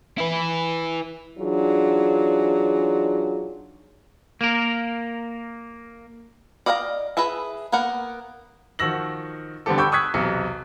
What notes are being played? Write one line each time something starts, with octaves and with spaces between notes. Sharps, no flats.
E4 B4
E3 F#3 D4 D#4 F4 G#4
A#3 A#4
D5 D#5 F5 F#5 A#5
G#4 B4 D#5 E5 A5
A#3 B3 A#4 F#5
D#3 F3 F#4 E6 A#6 F#7
D3 G3 B3 C4 G4 A4
G5 B5 C#6 D6 E6 G6
C#6 D#6 E6 F#6 G#6 B6
B1 E2 C3 C#7